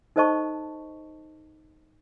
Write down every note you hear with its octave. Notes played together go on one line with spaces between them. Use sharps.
D#4 A4 C5 D#5 A5 C#6